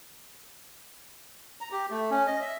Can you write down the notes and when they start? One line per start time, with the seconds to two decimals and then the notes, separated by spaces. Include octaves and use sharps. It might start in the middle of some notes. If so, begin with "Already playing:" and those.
1.61 A#5
1.72 G4
1.91 A3
2.11 C#4
2.27 D#5
2.41 E5